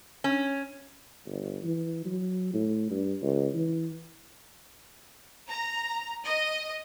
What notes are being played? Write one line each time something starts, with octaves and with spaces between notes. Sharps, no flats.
C#4
G1
E3
F#3
A2
G2
C#2
E3
A#5
D#5